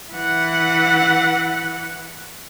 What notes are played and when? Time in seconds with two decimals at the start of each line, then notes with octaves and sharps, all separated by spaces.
0.13 E3 F#5